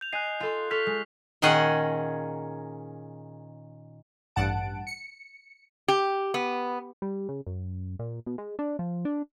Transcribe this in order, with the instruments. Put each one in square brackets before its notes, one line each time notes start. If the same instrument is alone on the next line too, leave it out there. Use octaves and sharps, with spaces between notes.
[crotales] G6 F7
[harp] D#5 G#5 [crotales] F#6 C7
[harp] F4 A4 C6 [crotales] G6 C7
[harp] A4 C#6 G6 [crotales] F6 B6 F7
[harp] G#3
[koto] A#2 D#3 C#4 G#4 D#5 F#5
[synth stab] A1 G2 F#5 A5 D7
C#7
[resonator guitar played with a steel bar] G4
B3
[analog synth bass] G3
C#3
F#2
A#2
B2
G#3
D4
F3
D4